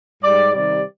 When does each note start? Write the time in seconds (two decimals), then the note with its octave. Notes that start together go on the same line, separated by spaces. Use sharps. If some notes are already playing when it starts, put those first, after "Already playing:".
0.22 G#2 G3 D5
0.52 C3 D#3 G3 D5